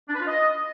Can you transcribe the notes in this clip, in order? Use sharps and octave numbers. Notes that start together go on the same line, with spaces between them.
D4
B4
F4
D#5